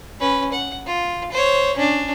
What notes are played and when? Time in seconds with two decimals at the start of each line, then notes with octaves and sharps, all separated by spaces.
0.20 C#4 B4
0.52 F#5
0.86 F4
1.32 C5 C#5
1.76 C#4 D4